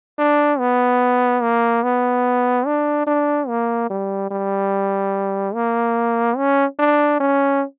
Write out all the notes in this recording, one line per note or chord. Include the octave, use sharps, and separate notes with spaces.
D4
B3
A#3
B3
D4
D4
A#3
G3
G3
A#3
C#4
D4
C#4